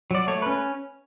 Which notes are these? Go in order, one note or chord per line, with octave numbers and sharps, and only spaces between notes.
F#3 D5
A3 C#5
C#4 B4